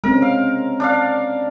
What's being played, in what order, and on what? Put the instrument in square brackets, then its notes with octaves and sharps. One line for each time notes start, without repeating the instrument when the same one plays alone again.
[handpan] G#3 C4 C#4 [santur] A#4
[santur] F5
D4 D5 F5